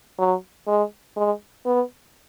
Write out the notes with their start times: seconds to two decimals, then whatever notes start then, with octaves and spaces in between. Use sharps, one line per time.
0.19 F#3
0.67 G#3
1.16 G#3
1.66 B3